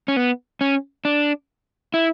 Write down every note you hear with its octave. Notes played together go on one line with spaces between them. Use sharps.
C#4
B3
C#4
D4
E4